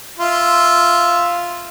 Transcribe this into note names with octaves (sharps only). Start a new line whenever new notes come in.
F4 E5